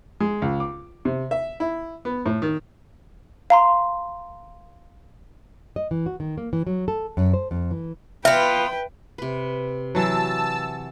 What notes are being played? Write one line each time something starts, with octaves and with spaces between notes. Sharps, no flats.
G#3
C#2
D6
C3
E5
E4
B3
A2
D#3
F5 A#5 C6
D#5
E3
F#4
D#3
A#3
E3
F#3
A4
F#2
C5
F2
E3
B3 F4 B4 E5 G5
C3 B4
E3 F#3 A5 E6